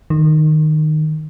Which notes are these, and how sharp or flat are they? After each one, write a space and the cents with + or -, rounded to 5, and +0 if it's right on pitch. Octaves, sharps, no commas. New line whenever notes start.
D#3 -15